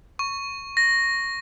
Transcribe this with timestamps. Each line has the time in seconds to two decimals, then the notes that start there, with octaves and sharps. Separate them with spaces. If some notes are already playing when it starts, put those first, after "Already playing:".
0.19 C#6
0.77 A#6